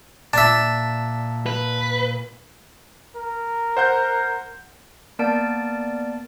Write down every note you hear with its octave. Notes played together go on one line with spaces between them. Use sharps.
A#2 D4 E5 A5 B6
B4
A#4
C5 F#5 G6
A#3 B3 A#4 D5 A5 D7